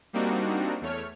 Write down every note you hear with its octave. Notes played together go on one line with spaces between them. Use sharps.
G3 A#3 C4 D4 D#4 F#4
E2 A3 C#5 F6